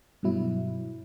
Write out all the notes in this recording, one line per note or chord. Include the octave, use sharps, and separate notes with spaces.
G2 B2 F#3 E4